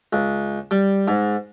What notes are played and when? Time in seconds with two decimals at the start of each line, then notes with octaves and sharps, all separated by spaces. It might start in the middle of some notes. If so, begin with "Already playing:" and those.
0.13 C#2
0.71 G3
1.08 G#2